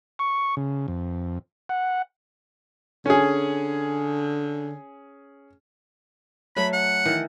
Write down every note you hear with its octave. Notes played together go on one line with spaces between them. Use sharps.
C#6
C#3
F2
F#5
D3 C#4 G#4
F#3 A3 B4 B5
F#5
D#3 E3